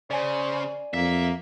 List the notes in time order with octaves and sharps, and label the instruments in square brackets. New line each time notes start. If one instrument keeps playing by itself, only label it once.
[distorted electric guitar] C#3 [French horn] C5 [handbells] D5 G#5
[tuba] F2 [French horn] A#3 [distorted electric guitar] E5